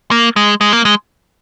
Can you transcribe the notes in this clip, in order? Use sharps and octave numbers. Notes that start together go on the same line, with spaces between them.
A#3
G#3
G#3
A#3
G#3